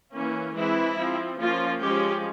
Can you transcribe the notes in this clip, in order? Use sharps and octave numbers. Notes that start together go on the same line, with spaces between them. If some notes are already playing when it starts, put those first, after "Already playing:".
E3 A#3 C#4
E3 G#3 C4 E4
F3 C4
F3 A#3 C#4 F4
F3 G#3 C#4 G4